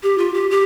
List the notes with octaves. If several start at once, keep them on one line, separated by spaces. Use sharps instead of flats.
G4
F4
G4
G4